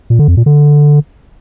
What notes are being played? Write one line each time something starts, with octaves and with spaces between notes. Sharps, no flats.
A#2
D3
F2
A#2
D3